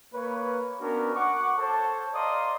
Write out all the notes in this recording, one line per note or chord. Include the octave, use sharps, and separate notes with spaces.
A#3 B4 C#5
B3 C#4 D4 F#4 A#4
F#5 C#6 D6
A4 C5 C#5 A5
D5 D#5 F5 A#5 C6 D#6